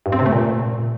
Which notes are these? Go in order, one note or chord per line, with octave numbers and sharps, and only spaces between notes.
G2
C4
C3
A3
A#2